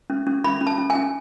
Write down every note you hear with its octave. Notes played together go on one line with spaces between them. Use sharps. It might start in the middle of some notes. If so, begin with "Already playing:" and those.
C#4
C#4
C#4 B5
C#4
A5
C#4
G#5
C#4